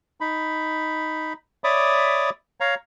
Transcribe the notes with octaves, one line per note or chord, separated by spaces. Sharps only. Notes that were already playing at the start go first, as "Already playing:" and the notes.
D#4 B5
C#5 D5 E5 B5 D6 D#6
C#5 F5 A#5